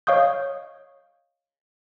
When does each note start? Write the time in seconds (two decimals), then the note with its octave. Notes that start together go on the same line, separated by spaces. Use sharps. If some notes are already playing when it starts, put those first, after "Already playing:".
0.07 C#5 D#5 F5 C#6 D#6 G6